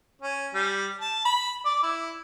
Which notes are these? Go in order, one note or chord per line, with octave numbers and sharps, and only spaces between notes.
C#4
G3
A5
B5
D5
E4